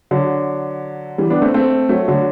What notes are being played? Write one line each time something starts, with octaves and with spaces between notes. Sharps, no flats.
D3 F#3
E3 G3
B3 D4
A3 C4
A3 C4
F#3 A3
D3 F#3